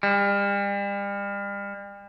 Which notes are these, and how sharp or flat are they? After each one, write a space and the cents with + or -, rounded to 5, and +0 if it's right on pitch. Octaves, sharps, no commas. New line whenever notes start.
G3 +40